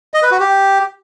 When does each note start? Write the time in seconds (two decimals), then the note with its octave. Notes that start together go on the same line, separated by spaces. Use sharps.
0.14 D#5
0.23 B4
0.31 F#4
0.40 G4